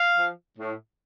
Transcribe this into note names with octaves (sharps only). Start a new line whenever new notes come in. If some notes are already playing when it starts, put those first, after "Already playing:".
Already playing: F5
F3
A2